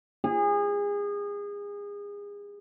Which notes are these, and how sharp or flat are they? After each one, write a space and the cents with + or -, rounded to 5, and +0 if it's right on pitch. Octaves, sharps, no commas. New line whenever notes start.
G#4 -30